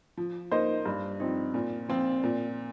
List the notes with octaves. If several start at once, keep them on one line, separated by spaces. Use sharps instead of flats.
F3
A#3 D#4 C5 D#5
G2
F3 C4 D#4
A#2
F3 C4 F4
A#2